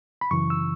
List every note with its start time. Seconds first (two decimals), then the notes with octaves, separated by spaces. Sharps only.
0.21 B5
0.31 F#2 C#3 E3 C#6
0.50 E6